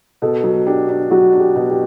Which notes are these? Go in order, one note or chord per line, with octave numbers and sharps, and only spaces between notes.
B2 A4
F#3
D4 G4
D4
F#3 F#4
D4
G4
B2
G4